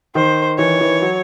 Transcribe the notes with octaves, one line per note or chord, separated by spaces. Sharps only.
D#3 C5
E3 C#5
E3
F#3